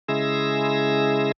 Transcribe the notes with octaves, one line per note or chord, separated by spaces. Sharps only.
C#3 G#3 E4 G#4 E6 A#6